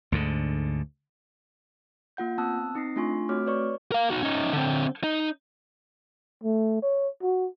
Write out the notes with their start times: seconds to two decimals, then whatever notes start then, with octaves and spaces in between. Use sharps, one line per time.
0.12 D2 G#2 D3
2.17 A#3 F4 F#5 G6
2.38 B3 C4 A5 D#6 E6 F#6
2.75 C4 D#4 D#6 A#6 C7
2.96 A3 D4 F4 G#5 C6 C#6
3.29 A3 C4 F#4 C#5 D6 F6
3.47 B4 C#5 D5 C#6
3.92 A#4 F5
4.10 D#4 F#4
4.23 C#4 D#4
4.53 D3 C4
5.04 D#4
6.44 A3
6.83 C#5
7.23 F#4